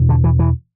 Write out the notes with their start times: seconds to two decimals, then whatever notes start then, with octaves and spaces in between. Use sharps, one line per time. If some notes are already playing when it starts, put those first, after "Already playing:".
Already playing: E2 B2
0.09 D3
0.24 E3
0.39 E3